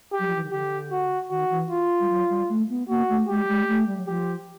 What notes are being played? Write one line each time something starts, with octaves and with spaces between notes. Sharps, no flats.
G4
F#3
F3
E3
D#3
D3 G4
F#4
D#3 F#4
E3
F4
G3
F#3
G3
A3
B3
A#3 F#4
A3
G#3 G4
G3
G#3
A#3
A3
G3
F#3
F3 G4